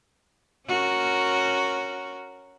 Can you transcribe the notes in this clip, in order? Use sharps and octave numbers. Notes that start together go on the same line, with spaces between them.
C#4 F#4 A#4